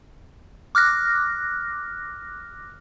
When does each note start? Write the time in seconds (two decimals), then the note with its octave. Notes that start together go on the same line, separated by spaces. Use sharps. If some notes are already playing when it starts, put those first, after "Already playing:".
0.75 D6 F6 F#6 A#6